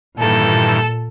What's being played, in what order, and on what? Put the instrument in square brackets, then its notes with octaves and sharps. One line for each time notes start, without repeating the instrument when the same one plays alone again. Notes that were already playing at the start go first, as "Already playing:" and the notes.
[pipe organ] G2 D#3 E3 [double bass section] A#2 [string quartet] A4